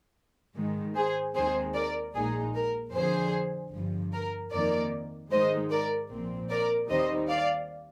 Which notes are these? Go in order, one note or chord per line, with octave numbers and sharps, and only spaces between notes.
G#2 D#3 G#3
G#4 C5
D#2 D#3 G#3 C4 G#4 C5
A#4 D5
A#1 A#2 G#3 D#4 G#4
A#4
F2 D3 F3 G#4 C5
G1 G2 F3
A#4
F2 D#3 A#3 A#4 D5
G#2 D#3 G#3 D#4 C5 D#5
A#4 D5
A#1 A#2 F3 C4
A#4 D5
D#2 D#3 G3 C4 D#4 C5 D#5
D5 F5